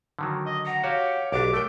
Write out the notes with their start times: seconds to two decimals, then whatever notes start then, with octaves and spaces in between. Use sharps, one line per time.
0.19 D3 D#3 F#3
0.46 D#5
0.66 F#5 A#5
0.84 F#4 G4 C#5 F5
1.32 B1 D4 G4 D6
1.54 A3 A#4 G5